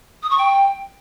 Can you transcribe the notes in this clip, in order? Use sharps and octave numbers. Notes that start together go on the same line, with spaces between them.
D#6
C#6
G5